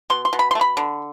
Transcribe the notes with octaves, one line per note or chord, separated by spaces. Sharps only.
B2 C6
C6
B2
B5
C6
A3
B5
D3